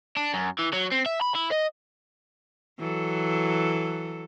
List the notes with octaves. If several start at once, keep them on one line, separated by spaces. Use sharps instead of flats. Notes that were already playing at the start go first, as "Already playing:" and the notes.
D4
F#2
E3
F#3
C4
E5
B5
E4
D#5
E3 F#3 A4